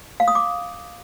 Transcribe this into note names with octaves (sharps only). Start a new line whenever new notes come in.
F5
D#6
D6